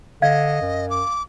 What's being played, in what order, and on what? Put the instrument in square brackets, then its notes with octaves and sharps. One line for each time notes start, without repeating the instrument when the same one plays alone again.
[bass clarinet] D3 [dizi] D#5 [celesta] F5 G#6
[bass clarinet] F#2
[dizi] D6